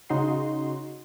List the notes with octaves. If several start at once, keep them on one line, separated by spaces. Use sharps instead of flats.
C#3 D#4 F#4 C6